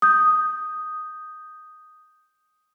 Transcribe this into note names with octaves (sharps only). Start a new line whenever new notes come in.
D#6 G6